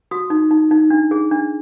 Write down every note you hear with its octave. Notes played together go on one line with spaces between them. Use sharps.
F#4 D#6
D#4
D#4
D#4
D4
G#4
D4